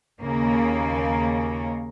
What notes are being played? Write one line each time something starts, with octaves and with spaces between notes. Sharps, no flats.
D#2 C#3 A#3